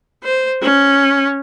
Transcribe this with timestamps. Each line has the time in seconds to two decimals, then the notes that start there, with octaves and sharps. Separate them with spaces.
0.24 C5
0.62 C#4